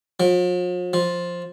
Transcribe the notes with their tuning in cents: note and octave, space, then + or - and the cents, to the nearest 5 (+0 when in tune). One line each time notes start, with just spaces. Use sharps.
F3 +45
F3 +5